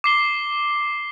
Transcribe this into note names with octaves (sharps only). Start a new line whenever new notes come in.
D6 C7 G7